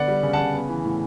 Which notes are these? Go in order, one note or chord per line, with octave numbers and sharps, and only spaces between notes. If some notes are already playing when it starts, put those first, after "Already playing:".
Already playing: D3 B3 D5 F#5
G3
C#3
C#3 F#5 A5
B3
E3
A2